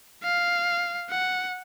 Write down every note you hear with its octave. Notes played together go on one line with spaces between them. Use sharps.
F5
F#5